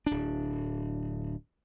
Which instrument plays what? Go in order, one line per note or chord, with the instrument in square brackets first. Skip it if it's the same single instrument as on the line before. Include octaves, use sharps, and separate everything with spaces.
[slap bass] D1 D4